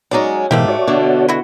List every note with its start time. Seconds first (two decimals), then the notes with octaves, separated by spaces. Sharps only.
0.11 F#3 G#3 C#4 D#4 D5
0.51 G#2 B2 E3 A3 A#3 G4
0.68 F#4 C#5 D5
0.87 B2 D3
1.28 E4 F#4